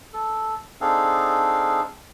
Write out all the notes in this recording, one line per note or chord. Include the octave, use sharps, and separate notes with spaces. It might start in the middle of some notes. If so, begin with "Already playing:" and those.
A4
C4 D4 D#4 G#4 A4 F5